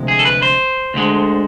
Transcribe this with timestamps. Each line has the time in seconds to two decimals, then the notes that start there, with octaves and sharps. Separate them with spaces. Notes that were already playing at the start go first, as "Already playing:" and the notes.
Already playing: D2 C3 F3 G#3
0.08 G#4
0.19 A4
0.25 B4
0.42 C5
0.94 D2 D3 G#3